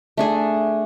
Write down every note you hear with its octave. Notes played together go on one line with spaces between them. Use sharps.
A3 D4 G#4